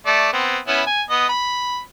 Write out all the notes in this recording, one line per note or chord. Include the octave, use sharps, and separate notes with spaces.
A3 D5
B3 C4
B3 C#4 E4
G#5
B3 D#5
B5